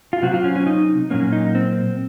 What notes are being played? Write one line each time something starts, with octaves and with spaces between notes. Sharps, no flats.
F4
C3 F#3 C4 F#4
F4
C#4
C#4
D#4
A#2 F#3 A#3 C#4
D#4
C4